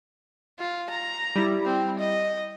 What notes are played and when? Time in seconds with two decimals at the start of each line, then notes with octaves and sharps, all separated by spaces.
0.59 F4
0.90 A#5
1.36 G3 E4
1.65 C4
1.99 D#5